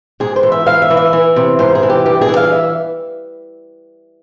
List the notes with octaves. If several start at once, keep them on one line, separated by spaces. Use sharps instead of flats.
G#2 G#4
C5
E3
E5
G#2 F5
E5
E3
E5
E3
C3
G#2 C5
G#4
E3
G4
G2 G4
G#4
E3
F5
E5